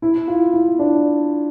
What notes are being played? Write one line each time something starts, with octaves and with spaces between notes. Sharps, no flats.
E4
F4
E4
D4